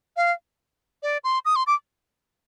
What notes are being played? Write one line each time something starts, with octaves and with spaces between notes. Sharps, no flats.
F5
D5
C6
D#6
C6
D6